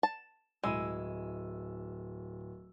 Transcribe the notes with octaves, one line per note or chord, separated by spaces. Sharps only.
A5
D1 G#3 E4 E6 D#7